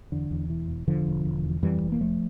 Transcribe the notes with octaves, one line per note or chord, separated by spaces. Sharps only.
E2 D3
E2
E1 E3
E1
E1 D3 F3
E1
E1
E2
F2 E3 G3
F1
A#3
F1 F3 A3